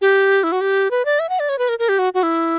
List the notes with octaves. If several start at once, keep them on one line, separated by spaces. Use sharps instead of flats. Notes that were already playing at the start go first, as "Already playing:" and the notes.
G4
E4
F#4
G4
B4
D5
E5
F#5
D5
C#5
B4
A#4
A#4
G4
F#4
F#4
E4